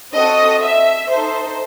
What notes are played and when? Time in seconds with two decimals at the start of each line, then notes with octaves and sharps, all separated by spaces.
0.14 C4 F#4 A4 D#5
0.63 E5
1.11 D#4 A4 C5